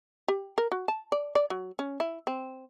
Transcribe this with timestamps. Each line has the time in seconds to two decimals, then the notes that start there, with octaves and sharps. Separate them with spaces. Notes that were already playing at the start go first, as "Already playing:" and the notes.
0.28 G4
0.58 A#4
0.72 F#4
0.88 A5
1.12 D5
1.35 D5
1.50 F#3
1.79 C#4
2.00 E4
2.27 C4